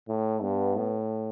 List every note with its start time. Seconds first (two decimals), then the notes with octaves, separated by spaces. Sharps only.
0.09 A2
0.42 G2 B3
0.76 A2